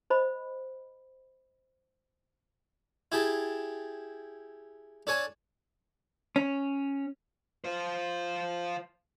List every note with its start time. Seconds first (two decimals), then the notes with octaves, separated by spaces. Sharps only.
0.10 C5 D#5 B5
3.12 E4 G4 G#4 G5 A5
5.07 D4 A4 C#5 G#5 A5
6.36 C#4
7.64 F4 C5